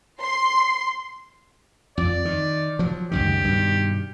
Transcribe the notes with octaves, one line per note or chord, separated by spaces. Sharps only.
C6
F2 D5
D#3
F3 F#3
C#2 F#2 D#3 G4
G2 B2 D#3